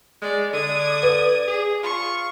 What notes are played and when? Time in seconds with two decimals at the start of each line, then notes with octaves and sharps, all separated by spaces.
0.22 G#3 D5
0.53 D3 D5 D#6 G#6
1.03 B4
1.48 G#4
1.83 F4 C#6